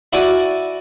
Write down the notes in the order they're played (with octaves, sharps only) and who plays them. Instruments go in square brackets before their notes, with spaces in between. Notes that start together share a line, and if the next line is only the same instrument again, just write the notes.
[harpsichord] E4 F#4 D5 G#5